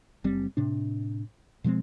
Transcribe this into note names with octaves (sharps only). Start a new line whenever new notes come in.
F#1 G3 C4
A2 C3 D4
B2 F3 G#3 C4